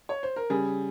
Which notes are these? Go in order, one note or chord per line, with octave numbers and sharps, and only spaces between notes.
C#5
C5
A#4
C#3 G3 G#4